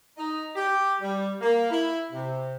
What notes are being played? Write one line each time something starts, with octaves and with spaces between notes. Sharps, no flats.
D#4
G4
G3
A#3
E4
C3